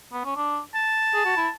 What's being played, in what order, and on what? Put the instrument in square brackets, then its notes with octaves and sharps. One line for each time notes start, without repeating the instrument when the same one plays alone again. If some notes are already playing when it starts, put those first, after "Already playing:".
[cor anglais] B3
C#4
D4
[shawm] A5
[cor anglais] G#4
F#4
E4